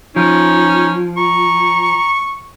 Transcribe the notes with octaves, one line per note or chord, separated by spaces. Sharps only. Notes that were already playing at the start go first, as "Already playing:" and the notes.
F3 C#4 D#4
A#5 C#6